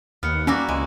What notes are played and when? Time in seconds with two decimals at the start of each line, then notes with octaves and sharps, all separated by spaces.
0.23 D#2 B3 F6 C#7
0.47 G3 A#3 C#4 F#4 F#5 A#5 E6
0.69 C#2 G#3